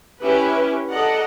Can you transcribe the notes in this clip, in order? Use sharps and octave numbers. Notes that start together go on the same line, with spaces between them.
C#4 E4 G4 B4
A4 D5 D#5 F#5 A#5